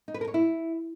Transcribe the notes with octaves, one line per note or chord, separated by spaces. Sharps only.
D#4
B4
A#4
C#5
E4